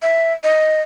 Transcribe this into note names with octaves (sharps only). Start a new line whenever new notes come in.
E5
D#5